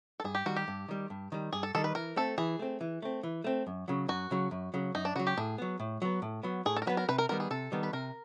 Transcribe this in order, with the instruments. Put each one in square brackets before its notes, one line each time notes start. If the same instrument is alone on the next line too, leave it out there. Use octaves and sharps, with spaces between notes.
[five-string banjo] A4
[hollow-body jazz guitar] G2 [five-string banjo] G#4
[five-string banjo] G4
[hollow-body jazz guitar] D#3 G3 [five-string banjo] F#4
[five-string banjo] G4
[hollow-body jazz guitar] G2
D#3 G3
G2
D#3 G3
[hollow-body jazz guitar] G2 [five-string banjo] G#4
[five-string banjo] A4
[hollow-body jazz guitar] D#3 G3 [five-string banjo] A4
[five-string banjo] B4
[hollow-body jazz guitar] E3 [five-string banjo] A#4
[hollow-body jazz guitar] A3 C4 [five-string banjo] A4
[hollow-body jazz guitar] E3 [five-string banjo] G#4
[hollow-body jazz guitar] A3 C4
E3
A3 C4
E3
A3 C4
F#2
C#3 F#3
[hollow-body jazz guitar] F#2 [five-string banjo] F#4
[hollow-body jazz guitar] C#3 F#3
F#2
C#3 F#3
[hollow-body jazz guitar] F#2 [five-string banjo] D#4
[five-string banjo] D4
[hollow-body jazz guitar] C#3 F#3 [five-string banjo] F#4
[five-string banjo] G4
[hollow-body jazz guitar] A2 [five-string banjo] G#4
[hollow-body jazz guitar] F#3 B3
A2
F#3 B3
A2
F#3 B3
[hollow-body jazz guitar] A2 [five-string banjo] G#4
[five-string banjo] A4
A#4
[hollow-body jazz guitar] F#3 B3 [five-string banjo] B4
[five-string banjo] A#4
[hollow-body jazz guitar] C3 [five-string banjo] B4
[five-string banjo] A#4
[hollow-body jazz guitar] D#3 G3 B3 [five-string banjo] A#4
[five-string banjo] G#4
[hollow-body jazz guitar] C3 [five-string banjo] A4
[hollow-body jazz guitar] D#3 G3 B3
[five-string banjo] B4
[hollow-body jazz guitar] C3 [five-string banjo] A#4